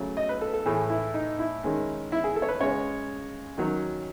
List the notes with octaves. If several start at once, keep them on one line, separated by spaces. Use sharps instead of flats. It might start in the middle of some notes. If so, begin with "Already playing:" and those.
Already playing: C#3 F#3 A3
D#5
B4
A4
A4
A2 E3 A3 G#4
E4
D#4
E4
D#3 G#3 C#4
E4
G#4
A4
C#5
B4
C#3 G#3 C#4 C#5
D#3 F#3 C#4